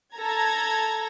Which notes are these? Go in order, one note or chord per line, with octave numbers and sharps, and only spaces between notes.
A4 A#5 G#6